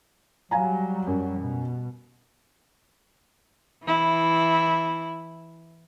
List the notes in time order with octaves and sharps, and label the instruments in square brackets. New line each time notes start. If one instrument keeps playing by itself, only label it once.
[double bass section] F#3 G3 [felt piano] F5 G#5 A#5
[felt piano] F#2
[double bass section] B2
[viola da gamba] E3 E4